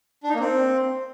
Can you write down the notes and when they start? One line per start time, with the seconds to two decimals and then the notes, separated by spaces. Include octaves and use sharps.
0.24 D4
0.29 D#4
0.35 A#3
0.40 C4